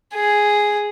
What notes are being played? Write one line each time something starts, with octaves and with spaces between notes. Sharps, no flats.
G#4